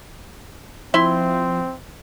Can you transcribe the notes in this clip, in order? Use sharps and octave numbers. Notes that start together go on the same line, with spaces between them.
F3 C4 E4 E5 C6